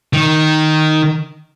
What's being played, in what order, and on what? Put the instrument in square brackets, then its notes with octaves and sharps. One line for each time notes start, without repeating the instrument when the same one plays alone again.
[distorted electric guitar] D#3